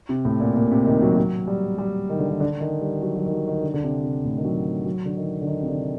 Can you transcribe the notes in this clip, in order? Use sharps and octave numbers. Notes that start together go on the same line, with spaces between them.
C3
A2
A#2
A#2
C3
D#3
F#3
F#3
G3
G3
D#3
D3
D#3
D3
D#3
G3
F#3
F#3
D#3
F#3
D#3
D3
D3
C3
C3
A2
D#3
F#3
F#3
D3
D#3
D3
D#3
C3
D3